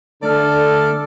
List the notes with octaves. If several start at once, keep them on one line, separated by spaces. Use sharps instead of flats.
D3 A3 A4 D5 F6